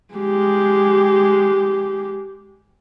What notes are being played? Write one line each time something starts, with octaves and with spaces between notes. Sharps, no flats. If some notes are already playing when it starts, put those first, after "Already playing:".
G#3 G4